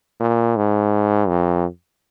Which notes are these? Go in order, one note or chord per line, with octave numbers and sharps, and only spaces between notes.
A#2
G#2
F2